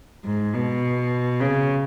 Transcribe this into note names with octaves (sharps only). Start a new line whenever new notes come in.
G#2
B2
C#3